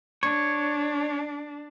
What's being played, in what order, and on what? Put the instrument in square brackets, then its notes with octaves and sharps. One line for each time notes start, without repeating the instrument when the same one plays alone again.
[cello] D4 [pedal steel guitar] C#5